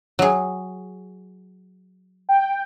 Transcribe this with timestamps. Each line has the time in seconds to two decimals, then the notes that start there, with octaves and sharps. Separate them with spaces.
0.19 F#3 G#4
2.29 G5